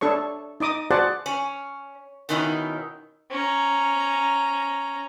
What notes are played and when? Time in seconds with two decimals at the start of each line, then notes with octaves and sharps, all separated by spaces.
0.01 D4 A4 C#5 C#6
0.60 D#4 D#5 D6 D#6
0.91 F#4 G#4 C5 D5 F#5 A5
1.26 C#4
2.29 B2 D#3 C#4 D#4 E4
3.31 C#4 A#5